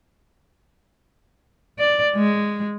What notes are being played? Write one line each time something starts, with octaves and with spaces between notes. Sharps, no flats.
D5
G#3